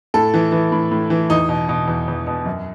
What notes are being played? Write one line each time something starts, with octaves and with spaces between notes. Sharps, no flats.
A2 A4
E3
E3
A2
A2
E3
E2 D#4
B2
B2
E2
E2
B2
F#2